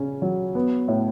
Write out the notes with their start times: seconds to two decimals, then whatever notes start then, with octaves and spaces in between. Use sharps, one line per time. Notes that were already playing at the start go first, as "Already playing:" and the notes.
Already playing: C#3 C#4
0.22 F#3
0.55 B3
0.88 A2